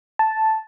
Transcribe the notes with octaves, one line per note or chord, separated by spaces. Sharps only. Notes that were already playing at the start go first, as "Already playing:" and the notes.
A5